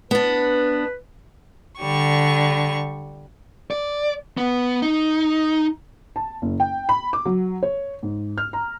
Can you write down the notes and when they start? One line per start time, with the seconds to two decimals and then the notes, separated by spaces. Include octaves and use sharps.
0.11 B3 D4 B4
1.78 D3 G3 C#6
3.71 D5
4.37 B3
4.82 D#4
6.16 A5
6.42 F#1
6.60 G5
6.89 B5
7.13 D6
7.25 F#3
7.63 C#5
8.03 G#2
8.38 F6
8.53 A#5